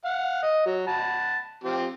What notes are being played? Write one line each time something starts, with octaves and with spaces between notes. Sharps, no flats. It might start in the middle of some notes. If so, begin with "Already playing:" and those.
F5 F#5
D#5
F#3
F#5 A5 B5
F3 C4 G4